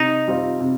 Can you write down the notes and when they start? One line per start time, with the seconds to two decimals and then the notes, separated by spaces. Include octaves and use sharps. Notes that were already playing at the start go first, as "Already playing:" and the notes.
Already playing: C3 D#4
0.28 G3 C4 F4
0.61 C3